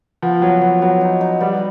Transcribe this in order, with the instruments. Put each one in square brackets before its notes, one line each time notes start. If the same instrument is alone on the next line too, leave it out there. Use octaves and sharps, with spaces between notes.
[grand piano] F3 [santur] B3
[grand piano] F#3 [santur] B3
[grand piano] F3 [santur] B3
[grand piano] F#3 [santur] B3
[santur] D#4
D#4
[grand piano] G3 [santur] B3